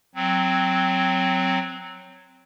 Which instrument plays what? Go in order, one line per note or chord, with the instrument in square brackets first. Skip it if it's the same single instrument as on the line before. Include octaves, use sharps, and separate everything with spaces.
[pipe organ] F#3 C4